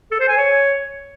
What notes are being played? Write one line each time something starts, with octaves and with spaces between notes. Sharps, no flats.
A4
C5
G#5
C#5